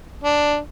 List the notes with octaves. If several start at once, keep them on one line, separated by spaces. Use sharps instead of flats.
D4